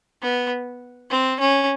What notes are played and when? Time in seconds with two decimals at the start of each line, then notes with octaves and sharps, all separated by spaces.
0.22 B3
1.10 C4
1.40 C#4